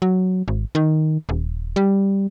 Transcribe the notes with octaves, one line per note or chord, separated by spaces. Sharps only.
F#3
G#1
D#3
D#1
G3